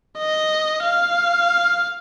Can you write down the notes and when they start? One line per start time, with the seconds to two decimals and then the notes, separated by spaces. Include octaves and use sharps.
0.19 D#5
0.83 F5